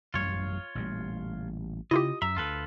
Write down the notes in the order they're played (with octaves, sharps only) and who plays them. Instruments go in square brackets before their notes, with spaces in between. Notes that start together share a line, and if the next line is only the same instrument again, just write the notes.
[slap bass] A1 F#2 G3 [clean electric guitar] F4 C#5
[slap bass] A1 A#2 G3
[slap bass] C#3 [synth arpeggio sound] E4 F4 G4 [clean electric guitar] D#5
[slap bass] F#2 [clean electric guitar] E5 [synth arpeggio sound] A#5
[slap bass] D2 [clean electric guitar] F4 A4 B4